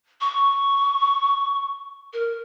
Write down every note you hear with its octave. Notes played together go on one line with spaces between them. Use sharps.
C#6
A#4